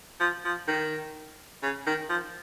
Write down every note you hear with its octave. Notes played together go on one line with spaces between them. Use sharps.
F3
F3
D#3
C#3
D#3
F3